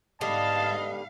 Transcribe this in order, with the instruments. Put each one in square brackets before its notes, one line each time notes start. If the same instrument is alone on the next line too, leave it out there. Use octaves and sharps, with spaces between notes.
[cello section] G#2 F5 [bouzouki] D3 G3 B3 [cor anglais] D#5 [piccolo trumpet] A5